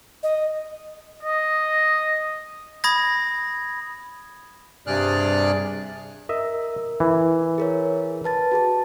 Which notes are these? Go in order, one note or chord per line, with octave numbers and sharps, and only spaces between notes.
D#5
D#5
B5 D#6 G#6 A#6
G2 C3 G#4 D5 F6 F#6
A#4 D#5 E5
E3
G#4 A#4 C#5
B4 A5 A6
F#4 G#4 A5